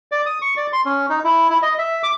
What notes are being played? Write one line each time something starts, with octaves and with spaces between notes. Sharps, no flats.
D5
D#6
C#6
D5
C6
C#4
D#4
E4
E4
D#5
E5
D6